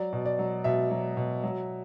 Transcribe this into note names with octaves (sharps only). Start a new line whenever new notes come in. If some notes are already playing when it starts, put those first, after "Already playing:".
Already playing: F#3 D5
B2
D5
F#3
B2 E5
F#3
B2
F#3